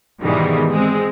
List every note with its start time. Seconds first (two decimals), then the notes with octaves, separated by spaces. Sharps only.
0.22 G#2 B2 D#3 E3 G3 G#3
0.71 G#3 C4